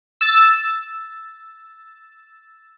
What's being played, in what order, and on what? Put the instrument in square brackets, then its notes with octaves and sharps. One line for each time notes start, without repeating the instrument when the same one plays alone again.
[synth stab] E6 A6